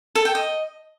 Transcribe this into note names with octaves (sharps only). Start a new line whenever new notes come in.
A4
G5
D#5